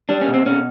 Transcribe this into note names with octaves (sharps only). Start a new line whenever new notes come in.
G3 D4
C#4
B2
C4
B2 C#4